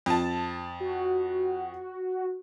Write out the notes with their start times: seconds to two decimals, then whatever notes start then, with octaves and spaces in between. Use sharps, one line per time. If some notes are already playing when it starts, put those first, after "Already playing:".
0.06 F2 A5
0.80 F#4